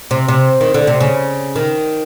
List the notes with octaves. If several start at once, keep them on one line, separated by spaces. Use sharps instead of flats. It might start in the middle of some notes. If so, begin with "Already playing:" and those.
C3
C3
D#3
D3
C3
C#3
D#3